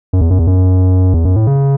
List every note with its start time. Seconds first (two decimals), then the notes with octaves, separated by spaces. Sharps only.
0.13 F#2
0.21 E2
0.31 F#2
0.39 E2
0.47 F#2
1.14 E2
1.25 F#2
1.36 A2
1.47 C#3